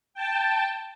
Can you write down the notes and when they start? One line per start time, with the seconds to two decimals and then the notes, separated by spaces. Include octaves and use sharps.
0.14 G5 A5